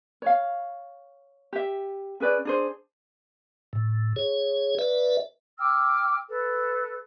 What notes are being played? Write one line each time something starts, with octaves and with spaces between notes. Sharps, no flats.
C#5 F5
G4 E5
C#4 G#4 B4 D5
D4 G#4 C5
A2
G#4 C#5
B4 D5 E5
G5 D6 E6 F6
A4 B4